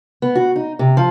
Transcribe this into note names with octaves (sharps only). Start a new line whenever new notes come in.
B3
F#4
D#4
C3
F3